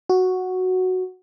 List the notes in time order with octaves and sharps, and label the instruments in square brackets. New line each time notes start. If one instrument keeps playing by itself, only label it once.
[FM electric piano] F#4